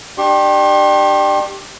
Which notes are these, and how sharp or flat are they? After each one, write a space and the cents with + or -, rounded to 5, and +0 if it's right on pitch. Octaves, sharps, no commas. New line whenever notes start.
D4 +30 G4 +0 C6 +45